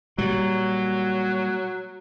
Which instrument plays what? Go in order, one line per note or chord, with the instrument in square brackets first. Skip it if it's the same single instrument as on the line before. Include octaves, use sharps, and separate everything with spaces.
[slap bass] A#2 G3 [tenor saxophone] F#3